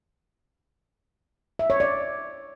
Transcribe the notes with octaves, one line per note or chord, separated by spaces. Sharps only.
E5
C#5
D5